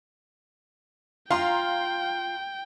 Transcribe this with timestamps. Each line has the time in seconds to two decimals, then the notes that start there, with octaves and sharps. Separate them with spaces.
1.31 F4 F5 G5 A#5 C6